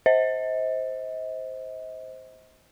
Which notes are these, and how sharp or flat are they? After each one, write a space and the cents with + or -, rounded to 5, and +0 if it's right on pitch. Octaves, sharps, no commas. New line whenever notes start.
C5 +0 D#5 +40